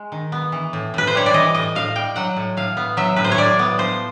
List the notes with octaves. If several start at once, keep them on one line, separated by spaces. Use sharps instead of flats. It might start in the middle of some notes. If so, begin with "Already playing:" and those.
Already playing: G#3
D#3
B3
E3
A2
A2 B4
C5
G3 C#5
D5
E3 D#5
A2 D#5
A2 F5
G3 G5
F#3 F#5
A2
A2 F5
B3
F#3 E5
A2 B4
C5
C#5
A2 D5
B3
F3 C5